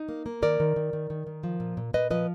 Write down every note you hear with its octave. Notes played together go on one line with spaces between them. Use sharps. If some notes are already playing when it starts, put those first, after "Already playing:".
Already playing: D#4
A#3
A#3
D#3 A#4 D5
D#3
D#3
D#3
D#3
D#3
F3
A#2
A#2
A#2 B4 D#5
F3 B4 D#5